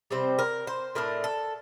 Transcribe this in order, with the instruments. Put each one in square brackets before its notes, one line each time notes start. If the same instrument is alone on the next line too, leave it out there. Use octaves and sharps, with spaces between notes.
[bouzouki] C3 G3 C4 C5
A#4
C5
A2 A3 D4 A#4
A4